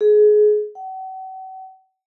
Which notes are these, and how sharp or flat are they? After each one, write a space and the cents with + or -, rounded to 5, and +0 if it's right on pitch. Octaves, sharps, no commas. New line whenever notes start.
G#4 +25
F#5 +40